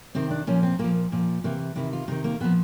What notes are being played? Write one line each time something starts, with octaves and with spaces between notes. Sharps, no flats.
C3 D#3 C4
D4
A#2 F3 C#4
C4
A#2 F3 A#3
A#2 F3
C3 E3 A#3
C3 D#3 E4
F4
C3 D#3 D#4
A#3
A#2 F3 B3